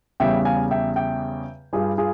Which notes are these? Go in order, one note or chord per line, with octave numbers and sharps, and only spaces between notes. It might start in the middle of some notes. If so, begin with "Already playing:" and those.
E2 C#3 G3 E5 G5
F5 G#5
E5 G5
E5 G5
G2 G3 F4 G#4
F4 G#4